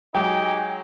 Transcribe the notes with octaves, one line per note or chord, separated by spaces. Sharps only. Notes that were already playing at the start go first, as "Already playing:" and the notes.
F#3 G#3 D#4 G4 G5 G#5